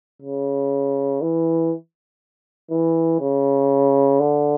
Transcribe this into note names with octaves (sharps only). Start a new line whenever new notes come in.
C#3
E3
E3
C#3
D3